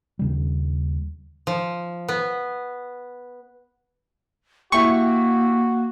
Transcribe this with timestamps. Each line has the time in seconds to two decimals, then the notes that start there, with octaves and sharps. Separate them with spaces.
0.19 D#2 C#3 G3
1.47 F3
2.08 B3
4.72 A#3 E4 F#4 G4 C#6